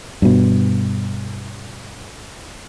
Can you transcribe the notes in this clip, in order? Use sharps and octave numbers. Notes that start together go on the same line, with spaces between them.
G2 B2